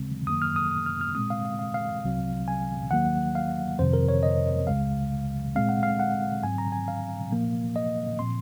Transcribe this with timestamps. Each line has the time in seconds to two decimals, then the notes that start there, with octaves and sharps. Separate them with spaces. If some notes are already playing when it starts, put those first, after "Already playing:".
Already playing: D#2 C#3 G#3 C4
0.27 F#2 D#3 F#3 A#3 D#6
0.42 F6
0.56 D#6
0.71 D#6
0.86 F6
1.01 F6
1.15 A#2 G#3 C4 D#6
1.30 F5
1.45 F5
1.59 F5
1.74 F5
1.89 F5
2.04 C2 C3 F#3 C4
2.48 G#5
2.91 D#2 D#3 F#3 A#3 F#5
3.35 F5
3.79 F2 C3 D#3 C5
3.93 A#4
4.09 C#5
4.23 D#5
4.67 C#2 C#3 G#3 F5
5.55 A#2 G#3 C4 F5
5.69 F#5
5.83 F5
5.99 F#5
6.43 G#2 F#3 C4 G#5
6.58 A#5
6.72 G#5
6.88 F5
7.31 A#2 F3 A#3
7.76 D#5
8.19 A#2 F3 C4 C6